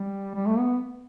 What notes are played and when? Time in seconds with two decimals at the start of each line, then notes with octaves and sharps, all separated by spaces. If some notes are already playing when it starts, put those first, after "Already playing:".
Already playing: G3
0.35 G3
0.47 A3
0.59 B3